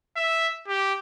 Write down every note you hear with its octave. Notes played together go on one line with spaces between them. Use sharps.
E5
G4